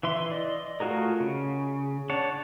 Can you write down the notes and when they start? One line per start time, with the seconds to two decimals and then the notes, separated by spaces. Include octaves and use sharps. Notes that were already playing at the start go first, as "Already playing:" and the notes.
0.03 E3 E5 C6
0.32 D5 D#5
0.80 A3 F4 F#4 G#4 A#4
1.20 C#3
2.10 D4 C#5 F#5 A5